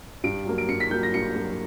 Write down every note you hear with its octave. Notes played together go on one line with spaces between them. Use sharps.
G2 D7
F#3 A#3
D7
G2 C#7
B6
F#3 A#3 G6
A#6
G2 C#7
F#3 A#3